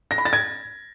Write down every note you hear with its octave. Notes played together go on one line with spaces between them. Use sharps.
A#6
B5
A6
G#6